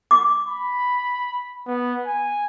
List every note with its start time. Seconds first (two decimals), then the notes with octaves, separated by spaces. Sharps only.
0.11 D6
0.47 B5
1.67 B3
2.07 G#5